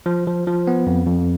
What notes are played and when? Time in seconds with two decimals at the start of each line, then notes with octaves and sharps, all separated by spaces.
0.06 F3
0.27 F3
0.47 F3
0.67 B3
0.87 F2
1.06 F2